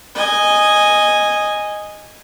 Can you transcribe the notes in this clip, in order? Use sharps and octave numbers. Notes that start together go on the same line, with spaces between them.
D#5 G#5